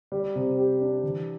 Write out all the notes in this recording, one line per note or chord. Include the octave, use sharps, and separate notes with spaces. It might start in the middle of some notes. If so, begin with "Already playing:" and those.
G3
C3
G4
D4
E3